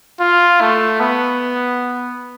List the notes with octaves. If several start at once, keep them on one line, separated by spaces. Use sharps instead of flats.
F4
A3
B3